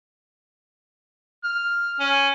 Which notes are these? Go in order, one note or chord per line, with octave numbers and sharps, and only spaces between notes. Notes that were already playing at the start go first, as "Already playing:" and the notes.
F6
C#4